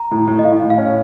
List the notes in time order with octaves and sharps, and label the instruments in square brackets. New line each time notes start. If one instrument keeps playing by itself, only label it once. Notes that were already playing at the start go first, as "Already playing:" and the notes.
Already playing: [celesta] A#5
[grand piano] A2
A2
[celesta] D#5
[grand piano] A2 [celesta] F5
[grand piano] A2
[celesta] F5
[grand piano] C#4